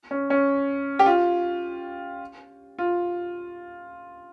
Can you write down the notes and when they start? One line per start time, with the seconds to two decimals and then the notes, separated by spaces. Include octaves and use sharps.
0.11 C#4
0.30 C#4
0.99 G4
1.06 F4
2.79 F4